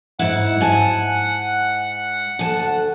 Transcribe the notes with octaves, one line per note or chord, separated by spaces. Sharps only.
G#2 E4 F#5
G#2 G#5 A5
D2 G#5 A5